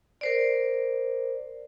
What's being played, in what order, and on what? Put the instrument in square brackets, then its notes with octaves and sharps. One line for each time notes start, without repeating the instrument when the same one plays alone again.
[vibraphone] A#4 C5 D5